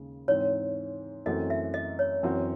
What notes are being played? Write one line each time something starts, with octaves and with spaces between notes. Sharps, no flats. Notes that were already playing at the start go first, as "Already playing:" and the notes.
Already playing: D#2 C#3 G#3 C#4
G#2 E3 C4 C#5
F#2 E3 A3 C4 F#4 D#5
E5
D#5
C#5
F#2 E3 C4 F#4